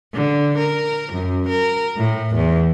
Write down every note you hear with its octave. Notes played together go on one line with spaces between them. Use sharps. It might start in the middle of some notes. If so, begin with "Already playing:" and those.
D3
A#4
F#2
A#4
A2
E2